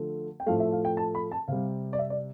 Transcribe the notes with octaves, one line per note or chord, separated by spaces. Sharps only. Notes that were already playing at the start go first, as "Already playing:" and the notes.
Already playing: D3 F3 A3
G5
A2 F3 A3 F5
E5
F5
G5
A5
B5
A5
C3 G3 F5
D5
E5
D5